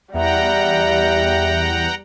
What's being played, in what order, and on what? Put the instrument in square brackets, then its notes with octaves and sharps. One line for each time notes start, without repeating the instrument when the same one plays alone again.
[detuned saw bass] E2 [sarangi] G3 [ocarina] E5 [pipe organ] F#5 G5 A#5